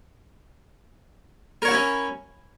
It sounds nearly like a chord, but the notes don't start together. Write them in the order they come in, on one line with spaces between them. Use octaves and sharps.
A#4 C#5 F#5 E4 C#4